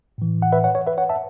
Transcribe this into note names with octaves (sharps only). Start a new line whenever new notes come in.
A2 E3
F#5
B4 E5
C#5 F#5
C#5
B4 E5
C#5 F#5
E5 A5